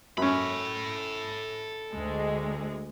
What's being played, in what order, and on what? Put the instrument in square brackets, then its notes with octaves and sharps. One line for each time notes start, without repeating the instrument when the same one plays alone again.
[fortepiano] F#2 C#4 [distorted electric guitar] A4 B5
[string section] D2 G#3